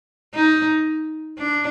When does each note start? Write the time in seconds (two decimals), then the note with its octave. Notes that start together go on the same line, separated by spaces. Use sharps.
0.34 D#4
1.39 D4